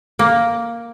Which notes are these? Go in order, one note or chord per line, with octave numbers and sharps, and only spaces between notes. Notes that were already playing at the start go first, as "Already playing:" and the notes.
A#3